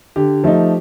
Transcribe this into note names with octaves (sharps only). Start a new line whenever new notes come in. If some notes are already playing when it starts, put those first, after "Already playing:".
D3 G4
F3 A3 D#4